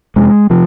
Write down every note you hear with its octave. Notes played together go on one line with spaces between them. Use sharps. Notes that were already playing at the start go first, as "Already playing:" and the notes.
F2 C3 G#3
C3 F3